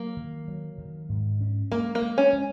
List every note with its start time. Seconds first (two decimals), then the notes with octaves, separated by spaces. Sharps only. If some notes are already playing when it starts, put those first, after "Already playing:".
Already playing: F#3 A#3
0.17 D#3
0.48 F#3
0.78 D#3
1.09 G#2
1.41 C#4
1.72 G#3 A#3
1.95 A#3
2.02 G#3
2.18 C#4
2.33 G#3